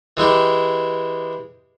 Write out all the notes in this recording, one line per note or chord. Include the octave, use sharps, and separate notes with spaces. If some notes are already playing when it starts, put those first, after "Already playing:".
E3 G#3 E4 G4